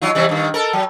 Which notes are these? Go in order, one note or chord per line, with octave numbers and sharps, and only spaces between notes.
F#3 D#4 F4
C3 E3 G3
G2 D#3
A4 A#4
F#3